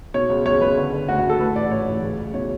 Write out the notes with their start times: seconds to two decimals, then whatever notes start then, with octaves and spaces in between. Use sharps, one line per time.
0.14 B2 C#5
0.30 C#2
0.46 C#2 C#5
0.61 C#2 B4
0.77 D3
0.93 D3
1.09 D2 F#4
1.19 D2 F#4
1.29 A4
1.40 A2 B4
1.55 A1 D5
1.71 A2 C#5
1.87 A1
2.02 C#2
2.18 C#2
2.34 B2 C#5